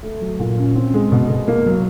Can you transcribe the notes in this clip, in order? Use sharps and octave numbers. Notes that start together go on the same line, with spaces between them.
A3
F#3
A#2
C#4
C4
G#3
B2
B2
A#3
F#3